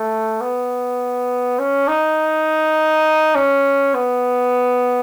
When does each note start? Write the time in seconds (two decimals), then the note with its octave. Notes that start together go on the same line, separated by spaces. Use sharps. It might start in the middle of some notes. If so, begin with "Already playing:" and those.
Already playing: A3
0.41 B3
1.59 C#4
1.88 D#4
3.35 C#4
3.94 B3